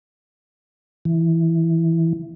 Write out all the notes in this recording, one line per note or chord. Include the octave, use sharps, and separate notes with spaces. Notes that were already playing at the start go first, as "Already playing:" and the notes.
E3